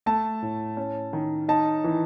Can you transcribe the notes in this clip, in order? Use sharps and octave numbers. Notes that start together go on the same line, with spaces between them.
A3 A5
A2
C#4
D#3
D#4 A5
E3